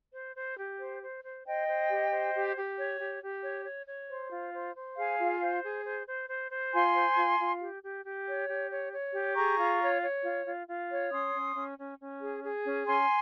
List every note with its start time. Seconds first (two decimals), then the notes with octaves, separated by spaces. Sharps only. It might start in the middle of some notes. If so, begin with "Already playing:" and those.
0.14 C5
0.36 C5
0.58 G4
0.80 C5
1.02 C5
1.24 C5
1.46 C5 D#5 G5
1.68 C5
1.90 G4
2.11 C5
2.34 G4
2.55 G4
2.77 C#5
2.99 G4
3.22 G4
3.43 C#5
3.65 C#5
3.87 C#5
4.09 C5
4.31 F4
4.53 C5
4.75 C5
4.97 G#4 F5 G#5
5.19 F4
5.41 C5
5.63 G#4
5.85 C5
6.07 C5
6.29 C5
6.51 C5
6.72 F4 G#5 C6
6.94 C5
7.16 F4
7.39 F4
7.60 G4
7.83 G4
8.04 G4
8.26 C#5
8.49 G4
8.70 C#5
8.92 C#5
9.14 G4
9.35 G#4 A#5 C#6
9.58 F4
9.80 C#5
10.02 C#5
10.24 F4
10.46 F4
10.67 F4
10.90 C#5
11.11 C#4 C6 D#6
11.34 C#4
11.56 C#4
11.78 C#4
12.00 C#4
12.21 G#4
12.44 G#4
12.65 C#4
12.87 C#4 G#5 C6